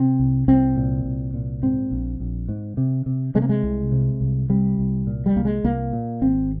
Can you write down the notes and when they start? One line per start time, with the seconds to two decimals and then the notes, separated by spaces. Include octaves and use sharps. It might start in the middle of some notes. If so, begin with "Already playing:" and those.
Already playing: C3 C4
0.19 C2
0.48 C2 C4
0.76 A#2
1.05 C2
1.34 A#2
1.63 G#2 C4
1.91 A#1
2.20 A#1
2.49 G#2
2.77 C3
3.06 C3
3.35 C3 G#3
3.42 A#3
3.49 G#3
3.63 C2
3.92 C3
4.21 C2
4.50 C3 G3
4.79 C2
5.07 A#2
5.26 G3
5.36 C2 A#3
5.45 G#3
5.64 C2 A#3
5.93 A#2
6.21 G#1 C4